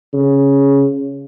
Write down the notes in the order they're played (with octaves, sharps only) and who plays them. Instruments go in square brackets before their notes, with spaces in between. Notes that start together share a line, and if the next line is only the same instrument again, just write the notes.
[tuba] C#3